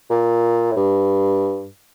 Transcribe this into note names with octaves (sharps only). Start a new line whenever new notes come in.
A#2
A2
G2